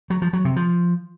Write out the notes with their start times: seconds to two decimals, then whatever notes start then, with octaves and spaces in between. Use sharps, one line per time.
0.10 F#3
0.22 F3
0.33 F#3
0.45 C3
0.56 F3